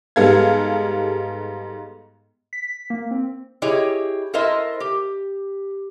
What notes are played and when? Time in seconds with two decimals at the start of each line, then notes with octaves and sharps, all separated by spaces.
0.16 G#2 G3 B3 A4 F5 G#6
2.53 B6
2.90 A#3
3.11 C4
3.62 E4 G4 G#4 C#5 D#5
4.34 E4 A4 A#4 C5 D#5 E5
4.80 G4